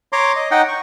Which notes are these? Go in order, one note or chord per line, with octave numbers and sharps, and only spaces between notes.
C#5 A#5 C6 D6
D#5
D#4 D#5 F#5 G5
C#6